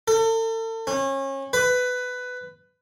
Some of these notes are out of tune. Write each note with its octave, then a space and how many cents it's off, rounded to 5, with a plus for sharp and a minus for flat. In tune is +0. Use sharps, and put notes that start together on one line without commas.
A4 +40
C#4 -30
B4 +15